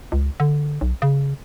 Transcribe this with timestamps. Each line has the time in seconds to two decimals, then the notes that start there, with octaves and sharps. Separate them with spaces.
0.12 C#2
0.40 D3
0.81 B1
1.02 C#3